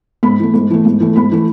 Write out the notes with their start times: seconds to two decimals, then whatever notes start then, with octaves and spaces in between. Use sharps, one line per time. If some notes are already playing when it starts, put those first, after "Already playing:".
0.23 G#2 B5
0.39 E3 A3
0.54 G#2
0.70 E3 A3
0.85 G#2
1.00 E3 A3
1.16 G#2 B5
1.32 E3 A3